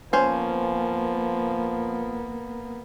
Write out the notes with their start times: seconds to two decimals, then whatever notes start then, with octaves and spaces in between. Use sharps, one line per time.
0.13 F3 A#3 B3 C#4 C5